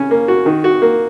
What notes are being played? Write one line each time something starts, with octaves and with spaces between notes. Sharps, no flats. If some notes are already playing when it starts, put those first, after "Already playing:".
Already playing: C#3 C#4
A#3
F#4
D#3
F#4
A#3